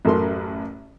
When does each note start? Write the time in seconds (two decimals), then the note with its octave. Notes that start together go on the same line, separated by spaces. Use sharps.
0.05 A1 F#2 A4 A#4 C6